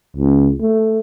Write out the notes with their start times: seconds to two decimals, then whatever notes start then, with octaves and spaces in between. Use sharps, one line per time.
0.17 C#2
0.61 A3